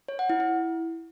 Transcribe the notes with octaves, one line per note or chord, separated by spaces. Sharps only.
C#5
F#5
E4
E4